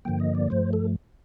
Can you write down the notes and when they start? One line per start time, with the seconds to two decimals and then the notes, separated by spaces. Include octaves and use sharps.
0.05 G2 D3 F3 A#3 G5
0.20 D#5
0.35 D5
0.50 G2 F3 A3 C5
0.73 A4